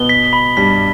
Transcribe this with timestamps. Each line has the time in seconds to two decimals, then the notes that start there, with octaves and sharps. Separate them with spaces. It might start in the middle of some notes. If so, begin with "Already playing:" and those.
Already playing: B2 B3 G7
0.09 B6
0.33 B5
0.57 G2 G3 B6